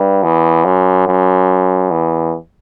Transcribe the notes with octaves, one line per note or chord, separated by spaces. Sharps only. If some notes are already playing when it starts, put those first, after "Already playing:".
Already playing: G2
E2
F#2
F#2
E2